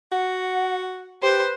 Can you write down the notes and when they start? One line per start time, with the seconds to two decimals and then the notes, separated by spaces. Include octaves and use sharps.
0.12 F#4 F#5
1.23 G4 B4 C5